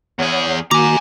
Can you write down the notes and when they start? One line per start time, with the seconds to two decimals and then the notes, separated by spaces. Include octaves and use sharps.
0.19 E2 G#4 C#5 F#5
0.71 D#3 A#3 F#4 G#5 A#5 D6